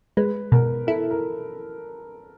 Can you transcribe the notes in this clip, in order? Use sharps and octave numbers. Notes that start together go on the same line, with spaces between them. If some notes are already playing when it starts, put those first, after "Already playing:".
G#3 B4
B2 A#4
E4 A4
A#4